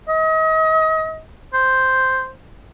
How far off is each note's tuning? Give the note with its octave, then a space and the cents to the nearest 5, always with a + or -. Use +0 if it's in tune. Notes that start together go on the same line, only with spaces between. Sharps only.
D#5 +35
C5 +0